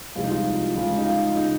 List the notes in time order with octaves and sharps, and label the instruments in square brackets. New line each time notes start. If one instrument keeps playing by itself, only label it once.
[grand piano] C2 C3 F3 G#3 F4
D#4
F4
C#2 C#3 G#3 F4
D#4
F4
C#3 D#4